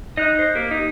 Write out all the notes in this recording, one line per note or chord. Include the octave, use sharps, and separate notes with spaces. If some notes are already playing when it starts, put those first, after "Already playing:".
D#4 D#5 F#6
C5
A#3 G4
D#4